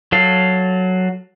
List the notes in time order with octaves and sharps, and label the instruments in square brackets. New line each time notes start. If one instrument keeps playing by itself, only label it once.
[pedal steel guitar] F#3 A4 F5